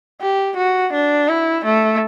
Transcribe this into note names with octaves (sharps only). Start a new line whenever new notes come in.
G4
F#4
D4
E4
A3